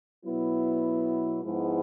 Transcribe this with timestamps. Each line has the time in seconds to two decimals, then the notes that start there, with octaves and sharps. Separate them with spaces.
0.24 B2 F#3 B3 E4
1.41 G#2 F3 G#3 B3 E4